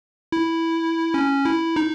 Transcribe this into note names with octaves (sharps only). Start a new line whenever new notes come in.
E4
C#4
E4
D#4